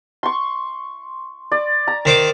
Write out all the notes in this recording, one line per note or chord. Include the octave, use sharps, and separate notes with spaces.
C6 C#6
D5
A#5
D#3 C5 D6